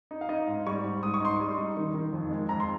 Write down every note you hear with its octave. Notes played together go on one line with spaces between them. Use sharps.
D#4
F5
D#4 D#5
G#2
G3 C#6
G#2
G#2 D#6
C#6
D#4 C6
G3 C#6
D#4
D#3
D#3
F2
G#3
F2 A#5
C6